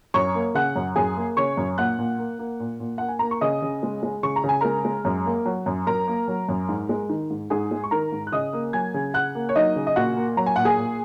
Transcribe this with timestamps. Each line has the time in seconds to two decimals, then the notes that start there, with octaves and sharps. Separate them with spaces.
0.14 F#2 C#5 C#6
0.35 A#3
0.55 C#3 F#5 F#6
0.76 F#2
0.96 F#2 G#4 G#5
1.16 A#3
1.37 C#3 C#5 C#6
1.57 F#2
1.78 A#2 F#5 F#6
1.99 A#2
2.19 A#3
2.39 A#3
2.60 A#2
2.80 A#2
2.98 A#3 F#5
3.08 G#5
3.19 A#3 A#5
3.31 C#6
3.41 C#3 D#5 D#6
3.62 C#3
3.83 G#3
4.03 G#3
4.23 C#3 C#6
4.36 A#5
4.44 C#3
4.49 G#5
4.61 G#3 A#4 A#5
4.85 G#3
5.05 F#2
5.26 A#3
5.46 F#3
5.66 F#2
5.87 F#2 A#4 A#5
6.08 A#3
6.28 F#3
6.49 F#2
6.69 G#2
6.89 G#3
7.09 D#3
7.30 G#2
7.50 G#2 G#4 G#5
7.71 G#3
7.84 C#6
7.91 D#3 A#4 A#5
8.12 G#2
8.27 F#6
8.32 C#3 D#5 D#6
8.53 A#3
8.73 F#3 G#5 G#6
8.94 C#3
9.14 C#3 F#5 F#6
9.35 A#3
9.49 C#5
9.55 F#3 D#4 D#5
9.76 C#3
9.87 D#5
9.96 A#2 F#4 F#5
10.16 A#3
10.37 F#3 A#5
10.46 G#5
10.56 A#2 F#5
10.65 G#4 G#5
10.78 A#2